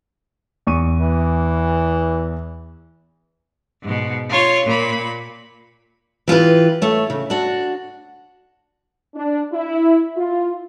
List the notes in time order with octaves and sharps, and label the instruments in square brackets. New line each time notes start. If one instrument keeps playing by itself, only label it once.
[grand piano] E2 C#6 D#7
[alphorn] E3
[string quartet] G#2 B2
F4 C#5
A#2 B5
[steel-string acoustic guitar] E3 F4 G4 B4
A3 C#5
C#3
D4 F#4
[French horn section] D4
E4
F4